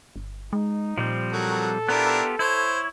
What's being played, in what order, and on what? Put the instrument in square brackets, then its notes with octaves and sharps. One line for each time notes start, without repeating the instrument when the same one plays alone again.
[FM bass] G1
[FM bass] G#3 [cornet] D#4
[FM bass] A#2 [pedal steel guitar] F3 G3 C4
[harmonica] F#3 F#4 A#4 [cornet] A4
[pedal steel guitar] B3 F4 G4 [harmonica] D4 E4 A#4
[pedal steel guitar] E4 C#5 [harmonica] C5